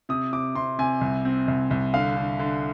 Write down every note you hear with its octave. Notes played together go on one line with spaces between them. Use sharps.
C3 D#6
C3 D6
C3 C6
C3 G#5
C2
C4
C2
C2
D3 F5
D3
D3